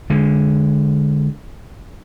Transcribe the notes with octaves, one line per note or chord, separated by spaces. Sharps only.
D3 G#3